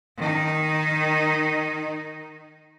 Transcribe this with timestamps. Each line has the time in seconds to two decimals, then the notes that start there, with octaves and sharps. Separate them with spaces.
0.17 D#3 D#4